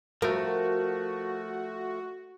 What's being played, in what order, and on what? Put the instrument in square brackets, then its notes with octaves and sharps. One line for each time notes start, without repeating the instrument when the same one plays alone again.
[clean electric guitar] F3 A3 [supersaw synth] F#4 [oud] A#4